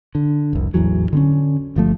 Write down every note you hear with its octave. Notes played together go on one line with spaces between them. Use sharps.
D3
F1 C2
A1 E2 E3 F#3
D3 C4 C#4
G1 F3 A3